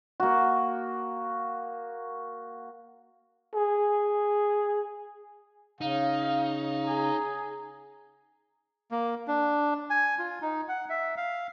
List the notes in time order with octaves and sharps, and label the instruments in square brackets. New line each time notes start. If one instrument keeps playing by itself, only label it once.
[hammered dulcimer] A#3 F#4
[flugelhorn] G#4
[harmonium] C#3 [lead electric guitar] D#4 [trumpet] F5
[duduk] G#4 [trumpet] A#5
[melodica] A#3
D4
G#5
F4
D#4
F#5
E5
F5